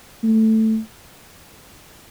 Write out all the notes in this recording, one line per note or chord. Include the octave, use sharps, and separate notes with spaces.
A3